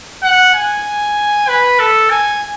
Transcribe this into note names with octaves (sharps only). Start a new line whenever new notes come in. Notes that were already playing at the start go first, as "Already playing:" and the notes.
F#5
G#5
B4
A4
G#5